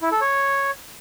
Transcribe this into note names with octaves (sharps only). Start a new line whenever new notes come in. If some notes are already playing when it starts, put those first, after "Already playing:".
E4
A4
C#5